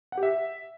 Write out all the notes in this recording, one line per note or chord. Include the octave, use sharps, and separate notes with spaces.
F#5
G4
E5